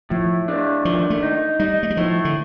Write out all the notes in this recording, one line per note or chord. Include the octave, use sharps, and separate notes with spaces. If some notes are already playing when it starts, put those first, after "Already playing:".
A2 F3
D4
D#3 F3
A3
D#4
G3 D#4
A3
G3
A2 F3
D3